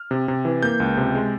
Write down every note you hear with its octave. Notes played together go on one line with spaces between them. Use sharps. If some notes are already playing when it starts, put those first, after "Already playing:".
Already playing: F6
C3
C3
E3
A#3 G6
C#2
C3
G#3